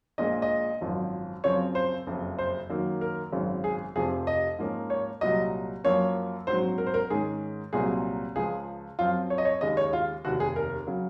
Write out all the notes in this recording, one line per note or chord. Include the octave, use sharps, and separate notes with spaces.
A#1 A#2 G#3 D#5
D#5
G#1 F#2 F3
F#2 C#3 F3 C4 C#5
C5
F#1 F2 C#3
C5
F#2 D#3 F#3 A#3
A#4
G#1 F#2 C#3 G#3
G#4
F1 F2 C3 F3 G#4
D#5
G#2 F3 A#3 C#4
C#5
C2 A#2 F#3 D#5
F#2 F3 A#3 C#4 C#5
A#1 G#2 F#3 C4 C5
A#4
C5
A#4
G#2 D#3 G#3 C#4 G#4
C2 A#2 F#3 C4 G#4
C#2 C#3 F3 G#4
F#2 F3 C4 F4
C#5
D#5
C#5
D#2 C#3 G#3 D#5
C#5
F4
F1 D#2 D#3 F#4
G#4
A#4
C#3 F#3